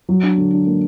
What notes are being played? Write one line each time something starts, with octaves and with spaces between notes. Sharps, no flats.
F#3
D4
D3
D4
A#3